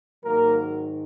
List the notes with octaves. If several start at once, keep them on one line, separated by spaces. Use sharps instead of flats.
G#2 D#3 F#3 A#3 A#4